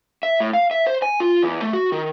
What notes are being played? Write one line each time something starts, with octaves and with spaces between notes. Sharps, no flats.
E5
A2
F5
E5
C5
G#5
F4
E2
A3
F#4
D#3